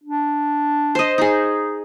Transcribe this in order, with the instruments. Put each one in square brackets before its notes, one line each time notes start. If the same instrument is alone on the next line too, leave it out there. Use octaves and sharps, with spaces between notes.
[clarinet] D4
[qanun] C5 D#5
D#4 G#4